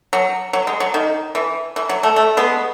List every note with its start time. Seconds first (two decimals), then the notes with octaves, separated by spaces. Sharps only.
0.13 F#3
0.53 F#3
0.67 G#3
0.80 F#3
0.94 D#3
1.35 E3
1.76 E3
1.89 F#3
2.03 A3
2.16 A3
2.37 G#3 B3